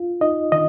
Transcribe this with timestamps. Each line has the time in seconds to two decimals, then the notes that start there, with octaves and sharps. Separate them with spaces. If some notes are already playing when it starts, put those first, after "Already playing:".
Already playing: F4
0.21 D#4 D#5
0.52 D#3 D#5